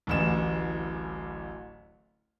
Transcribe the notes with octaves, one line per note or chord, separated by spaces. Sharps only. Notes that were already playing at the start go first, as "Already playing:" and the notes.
D1 A1 E7